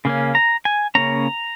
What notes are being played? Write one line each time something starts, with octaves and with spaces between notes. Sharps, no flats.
C#3 A#3 C#4
A#5
G#5
C#3 A#3 C#4 A#5